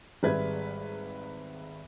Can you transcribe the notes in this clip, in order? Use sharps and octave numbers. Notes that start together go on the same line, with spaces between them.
G#1 G3 G#3 B4 E5 G#6